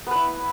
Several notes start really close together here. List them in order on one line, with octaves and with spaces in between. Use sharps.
B3 B4 E4